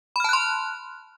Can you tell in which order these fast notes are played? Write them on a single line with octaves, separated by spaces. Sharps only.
B5 F6 A5 F#6 C6